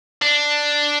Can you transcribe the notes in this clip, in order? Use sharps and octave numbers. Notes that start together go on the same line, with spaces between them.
D4